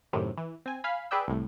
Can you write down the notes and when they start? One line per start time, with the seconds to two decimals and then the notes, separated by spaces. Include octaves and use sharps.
0.13 F#2 A2 C3 D#3
0.37 E3
0.66 C4 G#5
0.84 F5 G#5 B5
1.11 G#4 B4 D5 G5 E6
1.28 C2 A2